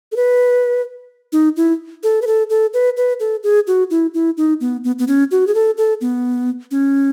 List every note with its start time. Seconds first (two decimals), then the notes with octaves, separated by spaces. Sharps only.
0.12 A4
0.16 B4
1.32 D#4
1.57 E4
2.03 A4
2.22 B4
2.27 A4
2.50 A4
2.73 B4
2.97 B4
3.20 A4
3.43 G#4
3.67 F#4
3.90 E4
4.14 E4
4.37 D#4
4.61 B3
4.84 B3
4.99 B3
5.08 C#4
5.31 F#4
5.47 G#4
5.54 A4
5.77 A4
6.01 B3
6.71 C#4